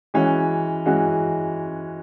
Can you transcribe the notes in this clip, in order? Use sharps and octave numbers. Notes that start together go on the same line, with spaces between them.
E3 G#3 C#4 F#4
E3 G#3 C#4 F#4